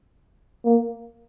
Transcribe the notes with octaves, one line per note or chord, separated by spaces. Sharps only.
A#3